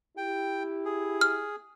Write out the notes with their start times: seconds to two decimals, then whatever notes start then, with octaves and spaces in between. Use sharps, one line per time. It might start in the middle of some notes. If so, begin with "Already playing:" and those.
0.17 E4 G4 G5
0.85 G#4
1.21 F6